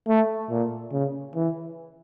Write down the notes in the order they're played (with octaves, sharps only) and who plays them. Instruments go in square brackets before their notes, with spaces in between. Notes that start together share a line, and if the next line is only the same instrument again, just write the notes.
[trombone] A3
A#2
C#3
E3